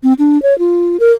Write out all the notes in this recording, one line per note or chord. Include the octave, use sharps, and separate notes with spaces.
C4
D4
C#5
F4
A#4